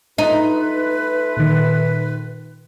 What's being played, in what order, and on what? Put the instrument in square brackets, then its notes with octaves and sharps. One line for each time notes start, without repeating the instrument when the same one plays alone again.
[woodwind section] A3 F4 B4 [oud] D#4
[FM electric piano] A#2 D#3